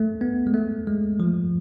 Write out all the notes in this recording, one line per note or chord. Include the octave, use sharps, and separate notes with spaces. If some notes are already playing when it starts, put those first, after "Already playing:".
Already playing: A3
B3
G#3
A3
G#3
F3